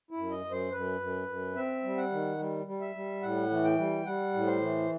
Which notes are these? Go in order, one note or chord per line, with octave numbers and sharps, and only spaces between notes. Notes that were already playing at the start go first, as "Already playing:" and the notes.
E4
F#2
D#5
F#2
C5
F#2 B4
F#2
F#2
C4 E5
G3
F#5
D#3
G3
G3
E5
G3
A2 F#5
E3
G5
G3
G3 F#5
A2
C5
E3